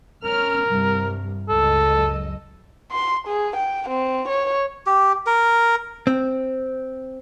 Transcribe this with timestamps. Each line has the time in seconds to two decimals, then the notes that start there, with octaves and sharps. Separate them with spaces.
0.24 C#4 A#4 F6
0.65 C2 G2
1.49 C#2 F#2 A4 D#5
2.92 C6
3.27 G#4
3.56 G5
3.89 C4
4.28 C#5
4.86 G4
5.27 A#4
6.07 C4